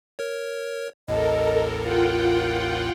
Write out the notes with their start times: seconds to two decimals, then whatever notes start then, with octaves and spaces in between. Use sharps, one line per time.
0.19 A#4 C#5
1.08 A1 D#2 A2 A4 A#4 D#5
1.83 F4 A#4 F#5 G5